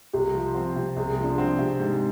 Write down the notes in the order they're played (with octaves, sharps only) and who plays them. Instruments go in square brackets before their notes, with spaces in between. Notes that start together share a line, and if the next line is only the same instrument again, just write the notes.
[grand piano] C2 [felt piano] G4
[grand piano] F3
C4
C3
[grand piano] C2 [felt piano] G#4
[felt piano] G#4
[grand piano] F3
[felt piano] D4
[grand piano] C4
C3
G#2